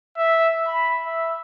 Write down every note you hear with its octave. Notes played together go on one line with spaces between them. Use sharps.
E5
B5
E5